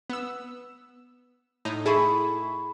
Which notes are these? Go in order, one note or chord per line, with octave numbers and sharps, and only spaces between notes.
B3 E6
A2 D#4
E4 G#4 A4 B5 C#6